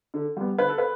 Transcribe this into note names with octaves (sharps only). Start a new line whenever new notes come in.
D3
G3 B3
D3 B4
A4
B4